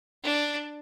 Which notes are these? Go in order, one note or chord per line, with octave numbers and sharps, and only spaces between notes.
D4